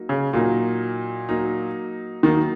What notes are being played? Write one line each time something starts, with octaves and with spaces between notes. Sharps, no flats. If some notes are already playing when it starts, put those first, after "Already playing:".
Already playing: F#3 A#3 D#4
C#3
A#2 F#3 A#3 D#4
F#3 A#3 D#4
D#3 F#3 A#3 D#4